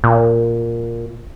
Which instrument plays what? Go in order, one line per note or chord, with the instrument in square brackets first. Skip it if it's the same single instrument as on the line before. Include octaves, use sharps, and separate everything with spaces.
[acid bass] A#2